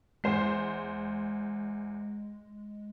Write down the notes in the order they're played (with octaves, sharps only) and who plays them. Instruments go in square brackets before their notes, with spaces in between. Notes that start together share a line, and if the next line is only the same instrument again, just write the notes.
[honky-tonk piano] E2 C5 C7 [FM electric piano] G#3